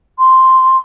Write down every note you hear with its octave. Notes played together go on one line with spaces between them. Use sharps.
C6